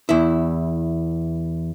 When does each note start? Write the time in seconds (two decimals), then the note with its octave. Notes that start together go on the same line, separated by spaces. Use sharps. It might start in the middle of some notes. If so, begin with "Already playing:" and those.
0.09 E2 E4